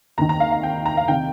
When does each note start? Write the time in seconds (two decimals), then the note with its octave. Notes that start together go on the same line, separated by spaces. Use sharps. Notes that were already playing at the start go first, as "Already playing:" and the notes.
0.18 D#2 A#5
0.21 D#3
0.29 A#5
0.40 F5
0.52 F5
0.63 G5
0.86 A#5
0.97 F5
1.08 C3 D#3 G5